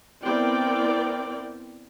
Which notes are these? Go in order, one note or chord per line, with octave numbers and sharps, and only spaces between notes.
B3 C4 E4 A#4 D5 G5